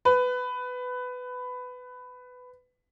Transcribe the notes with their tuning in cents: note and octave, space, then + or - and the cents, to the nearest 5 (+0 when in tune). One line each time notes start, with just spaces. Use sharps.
B4 +15